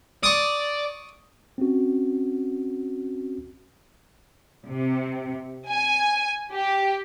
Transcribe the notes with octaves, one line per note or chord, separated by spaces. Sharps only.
D5 C#6 D#6
C4 C#4 F#4
C3
G#5
G4